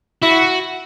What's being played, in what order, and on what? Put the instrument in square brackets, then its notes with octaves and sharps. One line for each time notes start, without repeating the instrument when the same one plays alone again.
[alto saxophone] E4 [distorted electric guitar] F#4